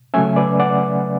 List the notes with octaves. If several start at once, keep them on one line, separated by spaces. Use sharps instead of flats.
C#3 F#3 A3 C#4 E5 G#5
B4 D5
D5 F#5